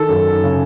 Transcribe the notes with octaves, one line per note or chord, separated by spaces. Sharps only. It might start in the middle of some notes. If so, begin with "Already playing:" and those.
Already playing: D#3 A4
F#2
C#3